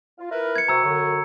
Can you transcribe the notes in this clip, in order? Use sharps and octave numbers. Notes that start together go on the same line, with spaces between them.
F4
E4 A#4 B4
G#6 C#7
C3 F#4 A#5 E6 G#6
F#2 D3 F#4